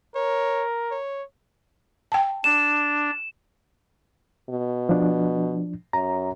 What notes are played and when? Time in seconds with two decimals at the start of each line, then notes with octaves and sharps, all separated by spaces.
0.15 A#4 C#5
0.91 C#5
2.12 G5 A5
2.44 D4 E7
4.49 B2
4.89 F3 D4
5.93 F#2 A#5